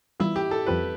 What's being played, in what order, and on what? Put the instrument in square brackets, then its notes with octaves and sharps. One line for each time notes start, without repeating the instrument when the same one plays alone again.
[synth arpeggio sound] E3 G3 B3 F4 [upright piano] E4
[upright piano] G4
A4
[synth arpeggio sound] F2 E3 G3 C4 F4 [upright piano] B4